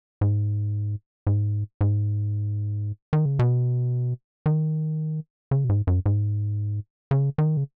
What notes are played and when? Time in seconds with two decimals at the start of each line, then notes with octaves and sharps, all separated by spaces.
0.21 G#2
1.27 G#2
1.81 G#2
3.13 D#3
3.25 C#3
3.39 B2
4.46 D#3
5.51 C#3
5.64 B2
5.69 G#2
5.87 F#2
6.06 G#2
7.11 C#3
7.38 D#3
7.57 C#3